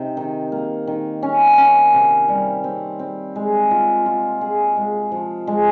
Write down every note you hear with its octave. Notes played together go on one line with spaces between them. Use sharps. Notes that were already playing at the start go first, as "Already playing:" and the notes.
Already playing: C3 D#4
D#3
A#3
D#3
C#4
C#4
C3
G3
C4
C4
G#3
F4
F4
G#4
G#3
F3
G#3